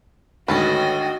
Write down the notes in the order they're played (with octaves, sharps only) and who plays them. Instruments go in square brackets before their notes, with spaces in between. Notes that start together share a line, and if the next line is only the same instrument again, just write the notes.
[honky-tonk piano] G#1 D2 [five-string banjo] C#4 A4 B4 [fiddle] F#4 D#5 [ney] G5